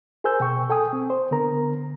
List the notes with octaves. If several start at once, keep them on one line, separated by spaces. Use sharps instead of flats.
G#4 A#4 C5 G#5 E6 G6
B2 G5 C#6
A4 G5 G#5 D#6
C4
C5
D3 B3 A#4 A#5